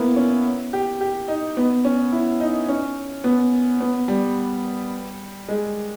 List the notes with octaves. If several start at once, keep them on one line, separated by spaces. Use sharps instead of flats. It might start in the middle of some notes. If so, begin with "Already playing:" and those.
Already playing: A#3 B3 E4
C#4
G4
G4
D#4
B3
C#4
E4
D#4
C#4
B3
B3
G3
G#3